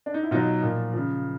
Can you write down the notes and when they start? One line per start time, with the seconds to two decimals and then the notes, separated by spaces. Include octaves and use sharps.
0.06 D4
0.14 D#4
0.24 E4
0.31 B2 F#3 D#4 F4
0.63 A#2 F3
0.94 C#3 F3